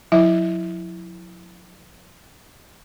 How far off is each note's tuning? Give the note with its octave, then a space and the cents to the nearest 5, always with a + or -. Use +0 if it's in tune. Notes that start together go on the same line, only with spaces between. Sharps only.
F#3 -45 E4 +0 E5 -20